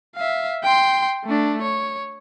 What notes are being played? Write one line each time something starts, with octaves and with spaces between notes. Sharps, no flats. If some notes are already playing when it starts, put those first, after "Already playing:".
E5 F5
G5 C6
A3 D4
C#5